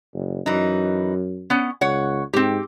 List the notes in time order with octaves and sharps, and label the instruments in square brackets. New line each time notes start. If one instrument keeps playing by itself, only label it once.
[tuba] F#1
[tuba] F#2 [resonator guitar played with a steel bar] E3 D#4
[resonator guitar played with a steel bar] B3 C#4
[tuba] C#2 [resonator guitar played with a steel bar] C#5 F#5
[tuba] G#2 [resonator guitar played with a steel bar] C4 G4